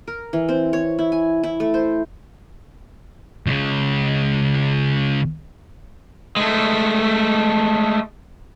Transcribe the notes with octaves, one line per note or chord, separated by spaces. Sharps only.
A#4
E3
C4
C#5
E4
G#5
E4
A3
C5
C#2 C#3
G#3 A3